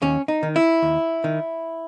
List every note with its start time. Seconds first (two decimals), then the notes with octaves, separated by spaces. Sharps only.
0.02 D#2 C#4
0.28 D#4
0.43 D#3
0.56 E4
0.82 D#2
1.24 D#3